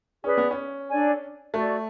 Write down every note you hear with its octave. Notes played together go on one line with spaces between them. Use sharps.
C#4 G#4 B4 D5
B3
C#4
D4 A4 D5 G#5
A3 F#4 A4 D5